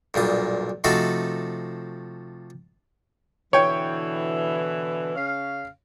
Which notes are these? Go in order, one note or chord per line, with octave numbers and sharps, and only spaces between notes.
B1 G2 A#2 D#6
C3 F3 A3 D#4 F#4 A4
B2 D3 E3 C#5 G5
C#3 C#4 F5